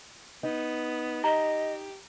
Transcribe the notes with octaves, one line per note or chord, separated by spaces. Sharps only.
B3 D#4
G4 D#5 A#5